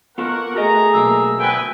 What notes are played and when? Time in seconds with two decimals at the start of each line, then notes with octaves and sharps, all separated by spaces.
0.18 A#3 B3 F4 A4 A#4 F#5 C#6
0.55 A3 F#4 G#4 A#4 D#5 A#5
0.93 B1 B2 A#3 E6
1.40 D2 B4 G5 G#5